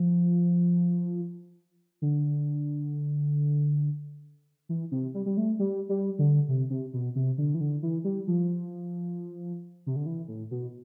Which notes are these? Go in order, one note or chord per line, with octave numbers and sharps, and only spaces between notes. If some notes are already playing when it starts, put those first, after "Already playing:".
Already playing: F3
D3
E3
C3
G3
G3
A3
G3
G3
D3
C3
C3
B2
C3
D3
E3
D3
E3
G3
F3
C3
D3
E3
A2
B2